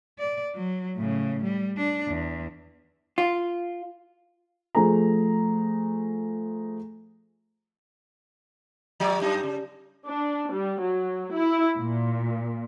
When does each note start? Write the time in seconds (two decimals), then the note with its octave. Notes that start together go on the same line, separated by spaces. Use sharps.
0.19 D5
0.55 F#3
0.96 A2 C#3
1.43 G3
1.77 D4
2.07 E2
3.18 F4
4.75 F3 A3 G#4 A#5
9.00 F3 G4 D5
9.21 F#2 D#4
9.43 C#3
10.06 D4
10.53 G3
10.82 F#3
11.34 E4
11.79 A#2